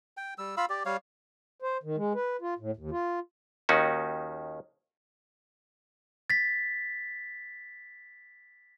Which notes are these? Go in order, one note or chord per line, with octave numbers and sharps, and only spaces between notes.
G5
G3 E6
F4 F5 B5 E6
G4 D5
G3 C#5 F5
C5
D#3
G#3
B4
F4
A2
D#2
F4
D#2 D#3 C#4 D#4 F#4
A6 B6